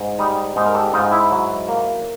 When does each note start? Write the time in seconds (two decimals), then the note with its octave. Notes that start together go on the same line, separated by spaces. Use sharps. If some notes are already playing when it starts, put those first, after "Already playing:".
Already playing: G#2
0.19 G3 D#4
0.56 G#2 D#4
0.66 A#4
0.75 G4 A4
0.93 G#2 D#4 F4
1.12 E4
1.31 F#3
1.68 A#3